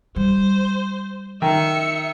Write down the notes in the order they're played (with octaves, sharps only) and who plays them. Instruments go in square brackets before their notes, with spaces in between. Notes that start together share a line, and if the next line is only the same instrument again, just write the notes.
[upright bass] G3 [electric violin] C5
[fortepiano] D#3 [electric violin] E5 C#7